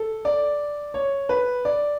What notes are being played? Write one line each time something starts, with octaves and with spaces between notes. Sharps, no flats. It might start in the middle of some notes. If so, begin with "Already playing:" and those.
Already playing: A4
D5
C#5
B4
D5